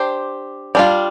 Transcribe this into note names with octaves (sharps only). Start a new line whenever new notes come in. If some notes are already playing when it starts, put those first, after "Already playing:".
Already playing: D4 G4 C5
G3 D4 F4